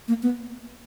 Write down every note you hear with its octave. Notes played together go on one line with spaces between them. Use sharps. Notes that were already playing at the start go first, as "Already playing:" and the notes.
A#3
B3